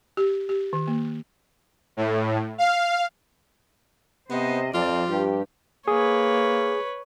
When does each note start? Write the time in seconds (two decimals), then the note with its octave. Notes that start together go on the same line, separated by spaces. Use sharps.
0.17 G4
0.49 G4
0.73 D#3
0.87 A#3
1.97 A2
2.58 F5
4.30 C3 B3 C5 D#5
4.74 F2 F3 C4 F4 D5
5.10 G2 G4
5.88 A#3 G#4 B4 C#5